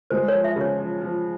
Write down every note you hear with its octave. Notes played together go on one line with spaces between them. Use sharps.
G#3 C5
C#5
F3
E5
C#3
C#5
F3
F3